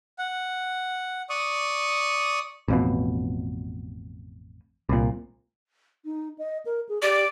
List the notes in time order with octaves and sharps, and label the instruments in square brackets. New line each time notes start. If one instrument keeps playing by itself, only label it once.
[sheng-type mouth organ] F#5
D5 C#6 D#6
[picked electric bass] A1 F2 B2
C2 A#2
[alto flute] D#4
D#5
A#4
G#4
[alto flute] G4 [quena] D5